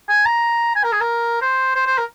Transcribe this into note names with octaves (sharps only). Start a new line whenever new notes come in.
G#5
A#5
G#5
A#4
G#4
A#4
C5
C5
C5
A#4